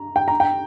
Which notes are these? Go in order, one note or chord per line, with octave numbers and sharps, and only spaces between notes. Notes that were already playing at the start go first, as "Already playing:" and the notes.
Already playing: A#5
G5
A#5
G5